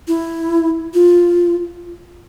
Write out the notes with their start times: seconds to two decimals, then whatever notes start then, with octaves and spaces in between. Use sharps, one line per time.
0.08 E4
0.94 F4